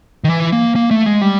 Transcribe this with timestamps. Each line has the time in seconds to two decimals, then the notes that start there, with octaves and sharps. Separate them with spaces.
0.24 D#3
0.28 E3
0.52 A#3
0.76 A#3
0.91 A3
1.06 G#3
1.21 G3